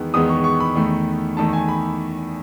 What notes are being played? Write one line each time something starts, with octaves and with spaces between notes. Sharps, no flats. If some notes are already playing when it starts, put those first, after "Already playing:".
Already playing: E2 D#3 G#3 B3
E2 D#3 G#3 B3 D#6
C#6
C#6
B5
E2 D#3 A3
E2 D#3 A3 A5
G#5
B5